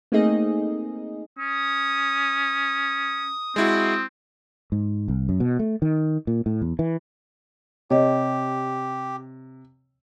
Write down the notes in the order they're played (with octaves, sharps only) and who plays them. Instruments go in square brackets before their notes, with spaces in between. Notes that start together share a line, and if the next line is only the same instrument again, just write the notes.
[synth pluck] A3 A#3 C4 D#4 G#4 D#5
[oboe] C#4 [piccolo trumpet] D#6
[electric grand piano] G#3 E4 F#4 [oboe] C4
[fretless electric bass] G#2
C2
F#2
B2
A3
D#3
A#2
A2
E2
E3
[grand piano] C3 [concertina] G4 [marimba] C#5 D#5